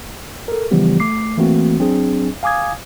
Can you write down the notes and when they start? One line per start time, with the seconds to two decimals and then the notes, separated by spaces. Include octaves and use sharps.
0.48 A4 A#4
0.71 C#3 E3 F3 G3 B3 G4
1.00 A3 D6 C7
1.37 E3 A3 A#3 C4 F#4
1.79 F#3 C4 D4 G#4
2.43 F5 G#5 D6 D#6 G#6